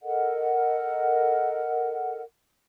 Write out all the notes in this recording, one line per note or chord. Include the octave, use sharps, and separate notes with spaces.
A4 A#4 D#5 F#5